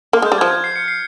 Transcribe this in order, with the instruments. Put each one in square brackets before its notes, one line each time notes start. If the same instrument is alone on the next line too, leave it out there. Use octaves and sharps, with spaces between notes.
[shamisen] A#3 [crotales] F6
[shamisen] G#3
[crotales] G6
[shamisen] G3
[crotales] G#6
[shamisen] F3
[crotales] G#6
C7
C#7
C7